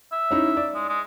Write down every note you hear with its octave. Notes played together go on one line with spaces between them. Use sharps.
E5
C#4 D#4 E4
D5
G#3
G#3